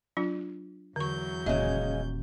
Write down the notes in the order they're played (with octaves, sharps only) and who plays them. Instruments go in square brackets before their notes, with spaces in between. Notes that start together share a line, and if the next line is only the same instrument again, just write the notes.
[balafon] F#3 D4 F4
[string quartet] E2 F#3 G6 [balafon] D3 C#6
[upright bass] D#1 [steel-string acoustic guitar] C#3 G#3 [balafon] E5